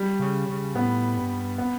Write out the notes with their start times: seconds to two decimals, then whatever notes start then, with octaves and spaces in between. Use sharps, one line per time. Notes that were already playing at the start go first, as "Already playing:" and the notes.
Already playing: G3
0.20 C#3
0.48 C#3
0.75 A2 B3
1.17 G2
1.58 B3